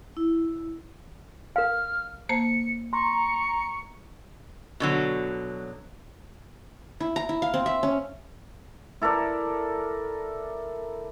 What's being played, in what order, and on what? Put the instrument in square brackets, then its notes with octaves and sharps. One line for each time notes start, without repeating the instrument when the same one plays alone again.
[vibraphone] E4
[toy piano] A#4 F5 [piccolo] F6
[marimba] A#3 C5 A5 [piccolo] C#7
[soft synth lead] A#5 [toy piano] C6 [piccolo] C#6
[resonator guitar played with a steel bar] B2 D3 F#3
[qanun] E4
A#5
E4
F5
C4
E5
C#4
[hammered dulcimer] E4 A4 A#4 D5